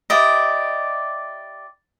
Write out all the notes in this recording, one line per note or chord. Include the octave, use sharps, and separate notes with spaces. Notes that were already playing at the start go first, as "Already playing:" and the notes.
E4 G4 D5 D#5